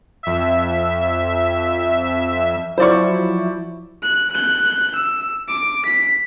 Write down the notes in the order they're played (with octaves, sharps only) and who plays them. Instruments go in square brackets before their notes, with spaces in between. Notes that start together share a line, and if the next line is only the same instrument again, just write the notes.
[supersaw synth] F2 E5
[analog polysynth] F3 F#3 E4 [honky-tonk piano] C5 D5 C#6
[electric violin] F#6
F#6 G6
E6
D6
B6